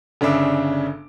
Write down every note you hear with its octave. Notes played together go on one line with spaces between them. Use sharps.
G1 C#3 D4 E5 D6